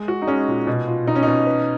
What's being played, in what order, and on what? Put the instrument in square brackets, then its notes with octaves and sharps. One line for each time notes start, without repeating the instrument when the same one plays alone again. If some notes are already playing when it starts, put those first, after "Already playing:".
Already playing: [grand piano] G#3
F#4
[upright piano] D#4
[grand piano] G#3 [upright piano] C#4
[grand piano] A#2
B2
F4
[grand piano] B2 [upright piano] D#4
[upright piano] C#4
[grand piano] B2 [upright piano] D#4
[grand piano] B4